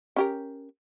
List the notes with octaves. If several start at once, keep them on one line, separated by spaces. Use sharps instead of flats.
C#4 G4 A#4